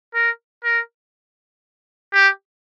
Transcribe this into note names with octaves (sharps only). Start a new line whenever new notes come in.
A#4
A#4
G4